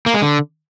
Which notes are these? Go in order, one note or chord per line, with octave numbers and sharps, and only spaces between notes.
A#3
G#3
D3